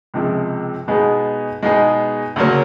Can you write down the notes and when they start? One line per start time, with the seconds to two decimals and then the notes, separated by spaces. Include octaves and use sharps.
0.14 C#2 C3 F3 G#3
0.88 B2 G#3 B3 D#4 G#4
1.62 B2 G#3 B3 D#4 G#4
2.36 D2 C#3 F#3 A#3 C#4